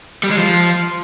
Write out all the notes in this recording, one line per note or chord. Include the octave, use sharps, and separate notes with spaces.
G3
G#3
F3